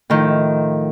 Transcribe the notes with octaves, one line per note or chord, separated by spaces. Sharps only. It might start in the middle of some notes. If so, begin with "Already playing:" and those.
A2 D#3 F3